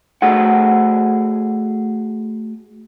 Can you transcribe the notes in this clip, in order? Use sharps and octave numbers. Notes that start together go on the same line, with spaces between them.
A3 F#4 G#4 F#5